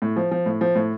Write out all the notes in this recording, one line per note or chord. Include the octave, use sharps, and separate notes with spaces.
A2
F3
F3
A2
F3
A2